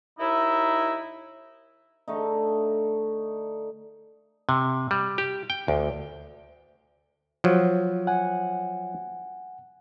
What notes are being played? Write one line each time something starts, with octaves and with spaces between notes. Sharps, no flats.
D#2 D#4 E4
D3 A3 D#4
C3
G3
G4
G5
D2
F3 F#3
F#5 G#5